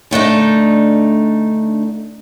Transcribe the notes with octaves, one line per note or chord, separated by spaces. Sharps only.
D3 A3 D4 D#4